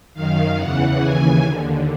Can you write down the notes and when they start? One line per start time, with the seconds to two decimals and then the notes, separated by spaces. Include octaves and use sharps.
0.14 F#2 D#3 F5
0.57 E2 C#3 E3 F#5
1.00 D#2 C#3 E3 G#5
1.42 D#2 D3